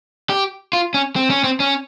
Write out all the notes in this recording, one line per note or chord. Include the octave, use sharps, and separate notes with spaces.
G4
F4
C#4
C4
C#4
C4
C#4